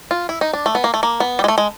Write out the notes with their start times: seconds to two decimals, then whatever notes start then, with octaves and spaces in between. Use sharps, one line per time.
0.11 F4
0.29 E4
0.41 D#4
0.53 D4
0.66 A3
0.75 B3
0.84 A#3
0.94 A3
1.03 A#3
1.20 B3
1.39 G3
1.44 G#3
1.48 A3
1.58 G#3